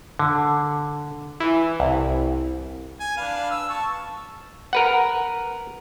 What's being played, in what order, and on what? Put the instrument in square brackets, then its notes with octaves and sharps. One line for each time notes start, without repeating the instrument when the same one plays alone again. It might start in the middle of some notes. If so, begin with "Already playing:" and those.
[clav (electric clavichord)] D3
[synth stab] E3
C2
[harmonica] G#5
D4 B4 F5
E6
A5 C#6
[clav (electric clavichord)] A#4 B4 F#5